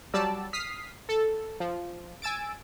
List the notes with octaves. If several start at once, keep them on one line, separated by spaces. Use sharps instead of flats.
F#3 G3 D5 A5 E6
D#6 F6 B6 C7
A4
F3
G#5 E6 A6 D7